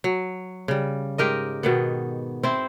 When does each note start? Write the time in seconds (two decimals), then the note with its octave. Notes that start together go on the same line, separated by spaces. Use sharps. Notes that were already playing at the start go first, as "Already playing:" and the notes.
0.04 F#3
0.68 C#3 G3
1.18 G#2 G4 A#4 D#5
1.63 B2 D#3 B3
2.43 C4 E4 C5